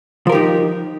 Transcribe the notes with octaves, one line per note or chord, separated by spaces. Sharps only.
F3 D#4 G4 A#4